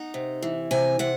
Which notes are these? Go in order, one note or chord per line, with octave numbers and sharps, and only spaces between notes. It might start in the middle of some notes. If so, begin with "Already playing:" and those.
Already playing: D#4 F#5
C3
E3
C3 G#5
C3 F#5